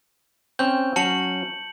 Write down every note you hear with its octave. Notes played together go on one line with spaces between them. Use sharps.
C4 C#4 G6
F#3 C#4 A5 C#7 F#7